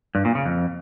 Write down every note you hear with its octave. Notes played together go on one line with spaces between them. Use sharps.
G2
A#2
C#3
F2